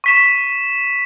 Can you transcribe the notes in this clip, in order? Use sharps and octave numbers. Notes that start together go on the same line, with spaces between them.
C#6 B6 E7